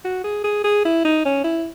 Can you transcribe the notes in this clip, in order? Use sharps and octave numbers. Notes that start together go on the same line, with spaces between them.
F#4
G#4
G#4
G#4
E4
D#4
C#4
E4